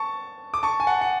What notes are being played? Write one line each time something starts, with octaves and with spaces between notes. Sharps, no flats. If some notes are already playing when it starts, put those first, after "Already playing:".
Already playing: A5 C#6
D6
A5 C#6
G#5
F#5 A5
F#5